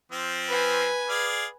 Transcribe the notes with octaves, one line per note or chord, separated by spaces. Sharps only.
F3 C4
B4 G#5
G#4 D5 F5